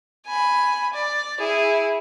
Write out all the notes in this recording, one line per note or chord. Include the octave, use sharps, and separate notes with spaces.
G#5 B5
D5
E4 G#4